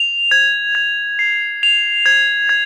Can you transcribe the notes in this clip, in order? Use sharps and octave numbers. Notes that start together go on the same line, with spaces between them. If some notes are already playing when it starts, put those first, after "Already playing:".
Already playing: F7
G#6
G#6
C7
F7
G#6
G#6